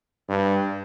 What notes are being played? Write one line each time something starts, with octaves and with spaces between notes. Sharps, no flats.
G2